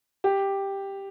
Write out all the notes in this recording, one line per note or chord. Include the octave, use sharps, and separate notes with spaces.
G4